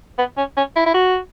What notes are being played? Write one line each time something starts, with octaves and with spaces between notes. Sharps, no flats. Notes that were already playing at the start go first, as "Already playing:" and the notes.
B3
C#4
C#4
E4
E4
F#4